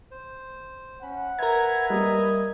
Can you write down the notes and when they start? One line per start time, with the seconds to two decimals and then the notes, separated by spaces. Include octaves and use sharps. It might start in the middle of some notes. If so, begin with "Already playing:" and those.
0.11 C5
1.02 C#4 F#5 B5
1.39 A#4 B4 E5 A#5 G#6
1.90 G3 A#3 G4 D#5